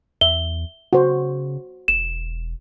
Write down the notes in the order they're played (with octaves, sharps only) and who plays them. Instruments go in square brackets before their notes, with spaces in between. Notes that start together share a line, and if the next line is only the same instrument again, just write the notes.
[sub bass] E2 [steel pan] E5 [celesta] G7
[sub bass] C#3 [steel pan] F#4 C5
[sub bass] E1 [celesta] E7